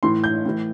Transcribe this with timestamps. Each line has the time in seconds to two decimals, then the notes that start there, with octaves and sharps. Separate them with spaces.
0.03 A2 E3 C6
0.24 G6
0.46 A2 E3